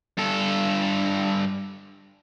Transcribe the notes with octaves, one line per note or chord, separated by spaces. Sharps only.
G2 A4